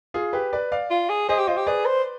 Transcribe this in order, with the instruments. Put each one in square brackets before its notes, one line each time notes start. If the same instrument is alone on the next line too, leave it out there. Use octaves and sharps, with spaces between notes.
[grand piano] F4 G#4
G4 B4
B4 D5
D5 F5
[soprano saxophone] F4
G#4
[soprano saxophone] G#4 [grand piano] C5 D#5
[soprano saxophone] G4
[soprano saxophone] F4 [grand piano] C5 D#5
[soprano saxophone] G4
[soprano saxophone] G#4 [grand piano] B4 D5
[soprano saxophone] C5